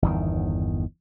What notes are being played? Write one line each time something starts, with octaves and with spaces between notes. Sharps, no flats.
G1 E2 D#3